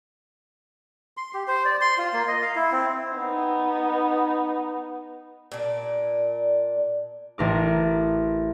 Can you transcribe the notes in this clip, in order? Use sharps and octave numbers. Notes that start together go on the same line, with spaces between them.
C6
G4
C5
D5
C6
F4
A#3
D#5
F5
E4
C4
B3 D#4
A#2 D4
A1 A#4 D6